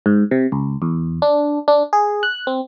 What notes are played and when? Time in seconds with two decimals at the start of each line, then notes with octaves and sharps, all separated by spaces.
0.06 G#2
0.31 C3
0.52 C#2
0.82 E2
1.22 D4
1.68 D4
1.93 G#4
2.23 F#6
2.47 C4